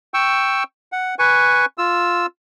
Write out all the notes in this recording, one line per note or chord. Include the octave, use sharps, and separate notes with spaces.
G5 C#6 E6
F#5
B4 G#5 C#6
F4 E6